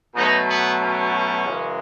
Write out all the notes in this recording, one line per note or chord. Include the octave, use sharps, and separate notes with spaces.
B2 F#3 A3 B3 D#4
B3
C#4
F#2 C#3 E3 G#3